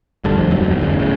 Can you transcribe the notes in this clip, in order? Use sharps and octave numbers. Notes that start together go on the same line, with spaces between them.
E1 G2 D3 D4
D1 D2 F3
F2 G#2 F#3
E1
F#1 D2 C#3
A2 C#3